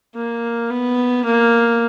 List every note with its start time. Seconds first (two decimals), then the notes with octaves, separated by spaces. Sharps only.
0.15 A#3
0.70 B3
1.25 A#3